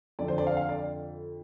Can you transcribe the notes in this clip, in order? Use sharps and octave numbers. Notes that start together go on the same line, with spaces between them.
F2 D3 D5
C5
D5
F5
F5
D5